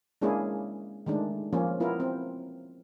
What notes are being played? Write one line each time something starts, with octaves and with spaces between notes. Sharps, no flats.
G#3 A#3 C#4 D4 E4 G#4
D#3 G#3 A3 D4
F3 A#3 C#4
B3 E4 F4 A#4
C4